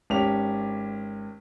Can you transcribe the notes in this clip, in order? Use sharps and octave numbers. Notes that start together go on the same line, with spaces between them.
G#1 C#4 G4 F7